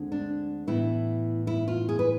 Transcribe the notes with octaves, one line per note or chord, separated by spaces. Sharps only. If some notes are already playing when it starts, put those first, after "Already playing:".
Already playing: D2 D3 G#3 C4
D4
A2 E3 B3 E4
E4
F4
G#4
B4